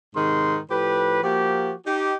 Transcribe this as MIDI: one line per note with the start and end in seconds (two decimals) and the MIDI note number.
0.16 0.59 44
0.16 0.59 48
0.16 0.59 51
0.16 0.59 63
0.16 0.59 84
0.70 1.22 45
0.70 1.22 53
0.70 1.22 67
0.70 1.22 71
1.23 1.74 53
1.23 1.74 58
1.23 1.74 66
1.23 1.74 67
1.86 2.14 63
1.86 2.14 67